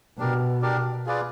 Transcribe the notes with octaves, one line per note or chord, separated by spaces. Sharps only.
B2 D4 G4 A#4 D5
D4 G4 A#4 D5
F4 G#4 B4 D5